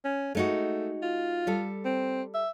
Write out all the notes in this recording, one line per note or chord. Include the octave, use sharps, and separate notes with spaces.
C#4
G#3 A3 D#4 F#4
F4
G3 A4
C4
E5